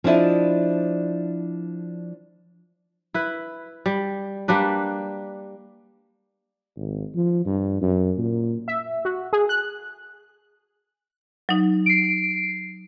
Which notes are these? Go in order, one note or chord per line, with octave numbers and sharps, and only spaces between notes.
F3 D4 E4 D#5
E4 B4
G3
G3 A#3 D4 B4
G#1
F3
G2
F#2
A#2
E5
F#4
G#4
F#6
F#3 D#4
C7 D7